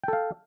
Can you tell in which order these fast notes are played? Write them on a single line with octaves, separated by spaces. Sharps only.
G5 A4 F5